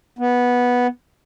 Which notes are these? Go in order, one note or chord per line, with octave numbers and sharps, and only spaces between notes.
B3